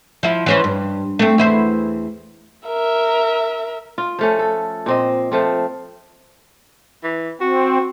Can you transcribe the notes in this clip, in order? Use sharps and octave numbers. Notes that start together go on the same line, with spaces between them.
F3 E4
E3 C#4 C5
G2
A3 C4
E2 E4 C5
A#4 E5
F4
F3 A3 C#4
A4
A#2 C4 D#5
F3 A3 C4
E3
C4 F#4